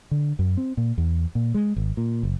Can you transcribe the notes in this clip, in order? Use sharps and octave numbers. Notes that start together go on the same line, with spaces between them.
D3
F#2
C4
A#2
E2
A#2
G#3
G#1
A#2
F#1